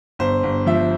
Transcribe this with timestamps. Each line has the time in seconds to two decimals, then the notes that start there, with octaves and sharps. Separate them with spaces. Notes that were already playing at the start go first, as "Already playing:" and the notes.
0.19 G1 C5
0.43 G1
0.66 F3 E5